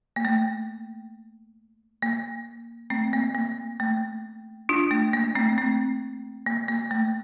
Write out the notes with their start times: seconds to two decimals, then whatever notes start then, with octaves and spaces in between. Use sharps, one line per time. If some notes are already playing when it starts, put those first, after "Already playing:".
0.16 A#3
0.25 A3
2.03 A#3
2.90 A3 C4
3.13 A#3
3.35 A#3
3.80 A3
4.69 D4 F4
4.91 A3
5.13 A#3
5.35 A3 C4
5.58 A3 C4
6.46 A#3
6.68 A#3
6.91 A3